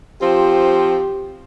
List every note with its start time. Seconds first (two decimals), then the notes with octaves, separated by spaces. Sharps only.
0.22 F3 C4 F4 G4